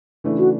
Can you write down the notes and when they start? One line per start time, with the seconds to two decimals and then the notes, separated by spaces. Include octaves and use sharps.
0.24 C#3 E3 A3 D4
0.38 F#4